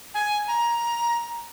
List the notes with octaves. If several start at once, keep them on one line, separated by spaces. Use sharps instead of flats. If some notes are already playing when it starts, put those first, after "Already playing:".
G#5
A#5